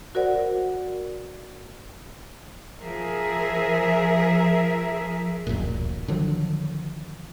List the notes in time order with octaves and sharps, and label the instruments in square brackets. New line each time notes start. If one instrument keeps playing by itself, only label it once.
[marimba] F#4 A#4 C5 D5 F#5
[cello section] F3 G#4 A#4 E5
[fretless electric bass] D1 A1 F#2 A#2
D3 D#3 F3 F#3